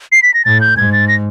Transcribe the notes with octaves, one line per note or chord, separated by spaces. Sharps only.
C7
B6
A#6
A2 A6
G6
G#2 G#6
A6
A#6